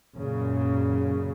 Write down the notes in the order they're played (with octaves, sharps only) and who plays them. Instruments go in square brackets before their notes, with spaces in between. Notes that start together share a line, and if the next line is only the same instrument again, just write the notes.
[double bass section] F#2 A#2 C#3